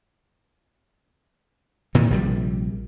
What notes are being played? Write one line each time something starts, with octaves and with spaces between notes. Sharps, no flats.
A#2 D#3 E3
A#1 C3 G3